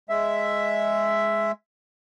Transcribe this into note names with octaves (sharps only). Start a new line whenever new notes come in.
G#3 E5